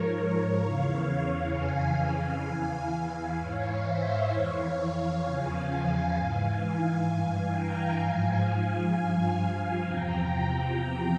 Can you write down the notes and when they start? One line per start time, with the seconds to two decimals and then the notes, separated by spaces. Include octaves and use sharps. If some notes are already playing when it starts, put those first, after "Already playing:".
Already playing: G#2 F3 A#4 C#5
0.60 E2 C#3 E3 C#5 F5
1.52 F2 C#3 E3 F5 G#5
2.44 E2 E3 F5 G#5
2.90 F5 G#5
3.37 G#2 E3 C#5 F5
3.83 C5 E5
4.29 F2 E3 C#5 F5
5.21 E2 C#3 F3 F5 G#5
5.68 F5 G#5
6.14 G#2 E3 F5 G#5
7.06 G2 E3 F5 G#5
7.52 G5 A#5
7.99 G#2 F3 F5 G#5
8.91 G2 F3 F5 G#5
9.37 F5 G#5
9.83 E2 C3 F3 G5 A#5
10.29 G5 A#5